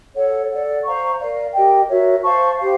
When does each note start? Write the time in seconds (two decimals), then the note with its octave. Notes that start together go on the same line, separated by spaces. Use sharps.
0.15 A4 C#5 F#5
0.51 A4 D5 F#5
0.85 C5 F5 A#5 C#6
1.19 A#4 D5 F5
1.53 G4 A#4 D#5 G5
1.89 F#4 A#4 C#5 E5
2.22 C5 F5 A5 C#6
2.57 G4 C5 F5